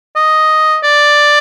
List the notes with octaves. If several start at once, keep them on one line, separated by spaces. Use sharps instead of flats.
D#5
D5